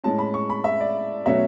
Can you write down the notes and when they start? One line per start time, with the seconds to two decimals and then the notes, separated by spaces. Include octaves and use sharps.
0.04 A2 G#3 C#4 A5
0.19 B5
0.34 C#6
0.50 B5
0.64 E5
0.80 D5
1.26 B2 F#3 A3 C#4 E5